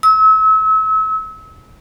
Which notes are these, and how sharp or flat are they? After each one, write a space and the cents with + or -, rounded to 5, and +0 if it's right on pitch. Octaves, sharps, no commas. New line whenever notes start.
E6 -35